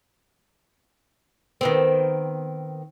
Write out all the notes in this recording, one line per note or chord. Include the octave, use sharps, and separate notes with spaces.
D#3 B3 C4